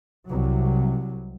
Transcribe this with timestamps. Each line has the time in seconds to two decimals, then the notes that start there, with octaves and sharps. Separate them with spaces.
0.26 C2 F#3